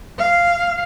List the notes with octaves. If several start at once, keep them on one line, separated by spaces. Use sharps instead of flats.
F5